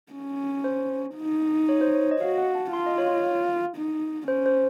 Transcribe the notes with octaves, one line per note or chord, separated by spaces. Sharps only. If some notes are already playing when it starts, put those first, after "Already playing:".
C#4
C5
D#4
C#5
C5
C#5
D#5
F#4 F5
F#5
A5
F4 C6
D#5
C#5
D#4
C#4 C5
C5